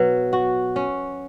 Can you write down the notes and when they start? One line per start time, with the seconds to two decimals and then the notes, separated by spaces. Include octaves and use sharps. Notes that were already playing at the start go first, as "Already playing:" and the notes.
Already playing: B2 F#3 B4
0.33 F#4
0.76 C#4